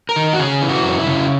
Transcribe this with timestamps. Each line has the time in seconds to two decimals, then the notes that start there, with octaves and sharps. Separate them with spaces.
0.09 A#4
0.16 D#3
0.33 F#4
0.39 C#3 G#4
0.61 E3
0.69 F#4
0.84 F#2
0.99 E4
1.07 C#3